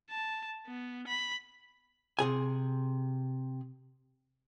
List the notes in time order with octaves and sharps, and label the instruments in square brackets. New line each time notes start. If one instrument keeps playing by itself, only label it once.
[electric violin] A5
B3
B5
[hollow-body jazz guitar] C3 G#4 G#5